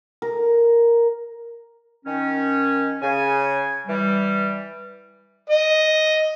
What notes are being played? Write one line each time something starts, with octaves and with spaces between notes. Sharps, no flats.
A#4
D#3 C#4
C#3 G#5
E3 G3
D#5